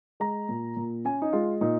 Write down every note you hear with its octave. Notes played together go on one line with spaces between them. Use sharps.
G#3 A#5
A#2
A#2
C#4 G#5
D#4
G#3 F4
A#2 D#4